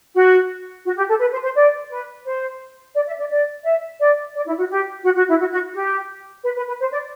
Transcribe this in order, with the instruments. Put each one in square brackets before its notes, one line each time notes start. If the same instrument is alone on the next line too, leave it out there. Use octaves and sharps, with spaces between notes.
[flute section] F#4
F#4
G4
A4
B4
C5
C5
D5
B4
C5
D5
E5
D5
D5
E5
D5
D5
E4
F#4
G4
F#4
F#4
E4
F#4
F#4
G4
B4
B4
B4
C5
D5